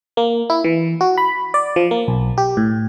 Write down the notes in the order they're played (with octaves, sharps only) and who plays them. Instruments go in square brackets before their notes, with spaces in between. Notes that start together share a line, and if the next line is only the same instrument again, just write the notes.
[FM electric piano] A#3
E4
E3
F#4
B5
D5
F3
A#3
B1
G4
A2